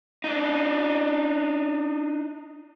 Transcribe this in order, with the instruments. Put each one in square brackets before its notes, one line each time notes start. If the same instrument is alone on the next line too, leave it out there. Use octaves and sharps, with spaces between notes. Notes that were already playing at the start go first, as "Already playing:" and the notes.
[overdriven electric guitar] D4 D#4